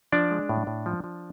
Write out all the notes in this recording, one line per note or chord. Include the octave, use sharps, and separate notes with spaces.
F3 D4 D5
G#3
A2
A2
F3
F3